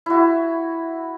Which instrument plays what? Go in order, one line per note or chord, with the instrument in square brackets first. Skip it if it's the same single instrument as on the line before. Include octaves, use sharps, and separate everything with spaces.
[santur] E4 F#4